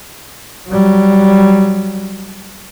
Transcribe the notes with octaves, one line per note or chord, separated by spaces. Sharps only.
F#3 G3